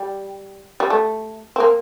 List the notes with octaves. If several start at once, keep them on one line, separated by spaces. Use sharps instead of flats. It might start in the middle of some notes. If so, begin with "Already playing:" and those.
Already playing: G3
G3
A3
C4
A#3